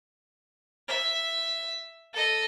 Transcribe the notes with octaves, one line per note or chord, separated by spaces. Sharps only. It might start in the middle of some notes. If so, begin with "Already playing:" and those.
E5
A4 D#5